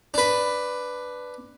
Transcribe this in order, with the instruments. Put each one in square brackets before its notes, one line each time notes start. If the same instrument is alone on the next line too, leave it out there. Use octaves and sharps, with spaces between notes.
[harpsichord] D4 B4